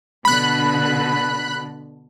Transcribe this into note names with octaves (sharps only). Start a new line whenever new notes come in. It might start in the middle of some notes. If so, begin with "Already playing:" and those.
B2 D3 B5 F#6